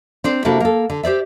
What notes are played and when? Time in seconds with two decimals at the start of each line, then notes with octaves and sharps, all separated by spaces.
0.24 C4 D4 C5
0.45 C3 A#3 D4 E4 F#4 A4
0.60 A#3 A4
0.90 D3
1.03 G4 C5 D5 E5